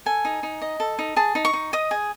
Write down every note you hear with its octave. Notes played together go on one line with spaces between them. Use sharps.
A4 G#5
D#4
D#4
D#5
A4
D#4
G#4 A5
D#4
C#6
D#4
D#5 D#6
G#4